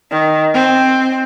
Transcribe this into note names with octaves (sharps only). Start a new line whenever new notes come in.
D#3
C4